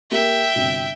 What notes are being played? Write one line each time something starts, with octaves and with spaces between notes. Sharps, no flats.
A#3 G4 A#4 E5 G5
G1 C3 F#4